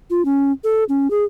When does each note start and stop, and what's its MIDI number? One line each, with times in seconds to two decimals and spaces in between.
0.10 0.24 65
0.25 0.52 61
0.64 0.84 69
0.89 1.10 61
1.11 1.24 68